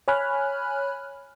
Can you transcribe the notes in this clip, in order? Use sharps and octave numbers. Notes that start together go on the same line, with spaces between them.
C#5 G#5 B5 F6 F#6